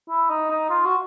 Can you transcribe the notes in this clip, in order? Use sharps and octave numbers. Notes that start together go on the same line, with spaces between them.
E4
D#4
D#4
F4
F#4